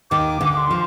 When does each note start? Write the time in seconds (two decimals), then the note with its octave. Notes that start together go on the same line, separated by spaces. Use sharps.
0.10 D#2 D#3 D6
0.41 D2 D3
0.56 C6
0.71 F3